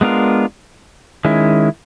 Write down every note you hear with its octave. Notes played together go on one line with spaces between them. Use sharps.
G#3 B3 D4 F4 A#4
D#3 G#3 C#4 E4